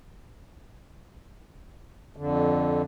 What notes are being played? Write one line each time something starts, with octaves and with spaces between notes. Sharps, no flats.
F2 D3